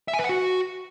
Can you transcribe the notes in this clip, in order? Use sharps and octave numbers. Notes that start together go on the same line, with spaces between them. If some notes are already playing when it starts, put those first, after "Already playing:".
E5
G#5
B4
F#5
F#4